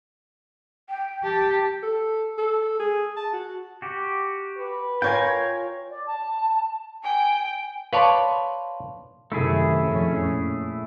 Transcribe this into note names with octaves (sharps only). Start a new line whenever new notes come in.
G5
G4 A5
A4
A4
G#4
A5
F#4
F#4 G4
B4
F4 A#4 C#5 G5 G#5
D5
A5
G5 G#5
B4 C#5 D5 F5 A5 C6
F#2 C3 D#3 A3 E4 G#4
F2 B2 C#4
A#2